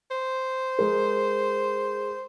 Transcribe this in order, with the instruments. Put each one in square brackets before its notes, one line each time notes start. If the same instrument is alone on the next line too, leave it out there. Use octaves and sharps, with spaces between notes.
[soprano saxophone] C5
[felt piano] G#3 A#4